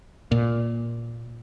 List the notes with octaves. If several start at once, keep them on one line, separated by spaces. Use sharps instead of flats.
A#2